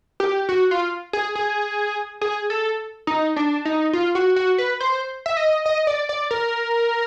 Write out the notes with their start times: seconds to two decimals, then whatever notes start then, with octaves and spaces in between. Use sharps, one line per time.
0.20 G4
0.49 F#4
0.71 F4
1.13 G#4
1.35 G#4
2.21 G#4
2.50 A4
3.07 D#4
3.36 D4
3.65 D#4
3.93 F4
4.15 F#4
4.36 F#4
4.58 B4
4.80 C5
5.26 E5
5.37 D#5
5.66 D#5
5.87 D5
6.09 D5
6.31 A#4